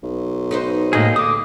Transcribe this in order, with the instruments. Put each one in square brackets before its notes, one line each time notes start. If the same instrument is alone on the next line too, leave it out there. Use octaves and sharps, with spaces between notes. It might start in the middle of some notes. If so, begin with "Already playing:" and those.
[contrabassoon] B1
[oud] D#4 B4 C5
[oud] A2 G#3 [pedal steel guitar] A#3 D#4 G#4
[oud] D3 [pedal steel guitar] D6 D#6